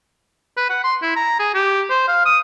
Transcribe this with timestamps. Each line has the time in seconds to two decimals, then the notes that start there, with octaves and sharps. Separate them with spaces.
0.57 B4
0.70 F#5
0.84 C6
1.02 E4
1.16 A#5
1.39 G#4
1.54 G4
1.90 C5
2.08 F5
2.25 D#6